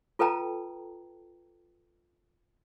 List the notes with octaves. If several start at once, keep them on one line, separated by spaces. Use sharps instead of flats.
F4 A4 B4 G5 A5 A#5